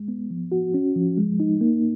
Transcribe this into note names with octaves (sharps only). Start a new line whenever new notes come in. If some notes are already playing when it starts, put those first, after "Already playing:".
Already playing: G#3
B3
F3
F#4
C#4
F3
G#3
D#4
A#3